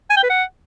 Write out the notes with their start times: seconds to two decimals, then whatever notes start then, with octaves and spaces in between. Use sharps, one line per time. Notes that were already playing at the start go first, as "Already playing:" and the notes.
0.10 G#5
0.16 G5
0.23 B4
0.29 F#5